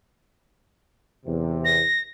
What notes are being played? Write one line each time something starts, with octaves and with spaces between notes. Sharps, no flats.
E2 C3
A#6